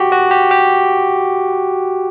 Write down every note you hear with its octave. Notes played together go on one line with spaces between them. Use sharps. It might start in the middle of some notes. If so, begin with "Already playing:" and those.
Already playing: F#4 G4
F#4
G4
G4